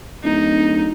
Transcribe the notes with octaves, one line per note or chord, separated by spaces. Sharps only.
D1 D#4